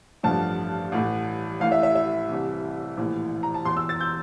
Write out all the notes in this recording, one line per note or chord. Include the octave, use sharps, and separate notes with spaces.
A1 G2 D3 F3 A5
A1 A2 E3
A1 A2 E3 F5
E5
E5
E5
C2 C3 E3
A#1 A2 E3
A#5
A5
E1 E2 E3 C6
E6
A6
G6